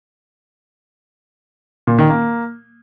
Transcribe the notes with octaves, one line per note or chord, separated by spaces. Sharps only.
A#2
D#3
A#3